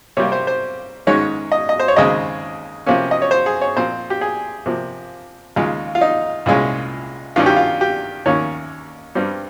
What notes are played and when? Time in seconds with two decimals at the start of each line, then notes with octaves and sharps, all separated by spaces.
0.17 C3 G3 A#3 C#5
0.32 C5
0.47 C5
1.07 G#2 D#3 G#3 C#4 C#5
1.52 D#5
1.69 D#5
1.79 C5
1.88 C#5
1.96 D#2 C#3 G#3 C4 D#5
2.86 C3 F3 A#3 C#4
3.11 D#5
3.22 C#5
3.31 C5
3.46 G#4
3.62 C#5
3.76 A#2 F3 C4 C5
4.10 G4
4.21 G#4
4.66 C3 F3 A#3
5.56 D#2 C#3 G#3 F4
5.95 F4
6.01 D#4
6.46 C2 A#2 G#3 C#4
7.36 G2 D#3 G3 C#4 F4
7.46 G4
7.56 F4
7.81 G4
8.26 D#2 D#3 A#3 C#4 C#5
9.15 G2 G3 C4